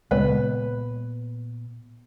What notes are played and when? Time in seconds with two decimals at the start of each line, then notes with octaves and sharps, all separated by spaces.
0.11 C#2 A#2 B3 B4